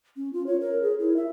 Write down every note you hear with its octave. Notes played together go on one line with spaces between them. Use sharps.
C#4
F4
C#5
A#4
G#4
E4
E5